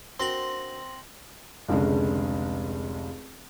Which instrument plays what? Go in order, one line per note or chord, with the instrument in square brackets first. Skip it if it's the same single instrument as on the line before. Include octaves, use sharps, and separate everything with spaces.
[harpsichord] C4 [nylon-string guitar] D4 F#4 A#4 [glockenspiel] C6 A#6 F#7
[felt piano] F1 C#2 D3 G#3 C#4